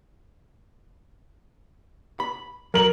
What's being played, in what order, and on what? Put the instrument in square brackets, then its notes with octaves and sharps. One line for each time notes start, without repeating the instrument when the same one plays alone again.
[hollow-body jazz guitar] B5
[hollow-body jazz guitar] F#3 [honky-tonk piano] A#4 F#7